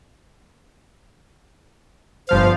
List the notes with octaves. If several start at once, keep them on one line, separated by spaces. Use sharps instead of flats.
G1 F3 C5 F5